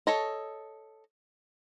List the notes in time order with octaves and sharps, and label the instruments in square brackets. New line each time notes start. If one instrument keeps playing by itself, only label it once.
[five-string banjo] A4 C#5 D#5